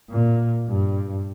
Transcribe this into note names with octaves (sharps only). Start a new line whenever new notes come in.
A#2
G2